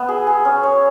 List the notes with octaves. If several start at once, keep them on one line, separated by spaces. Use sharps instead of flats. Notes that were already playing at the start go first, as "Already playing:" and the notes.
Already playing: B3 E5
G#4
G#4
C#4
C#5